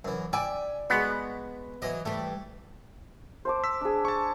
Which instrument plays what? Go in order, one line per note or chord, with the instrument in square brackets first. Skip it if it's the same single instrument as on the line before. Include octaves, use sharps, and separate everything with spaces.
[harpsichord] F#2 E3
[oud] D5 [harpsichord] E5 [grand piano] G5 G#5
[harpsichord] G#3 F#4 [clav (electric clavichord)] B3 [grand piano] B5
[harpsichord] E3 D#5 [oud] F#3
[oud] E3 G3 [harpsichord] A3
[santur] C5 A5 D6
[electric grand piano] E6 B6
[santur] D4 G#4
[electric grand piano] A5 C#6